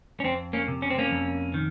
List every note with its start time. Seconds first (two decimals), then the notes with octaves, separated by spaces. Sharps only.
0.20 C#4
0.24 F2 C4
0.53 A#3 C#4
0.68 C3
0.82 C#4
0.90 C4
0.98 A#3 C#4
1.11 F2
1.54 D#3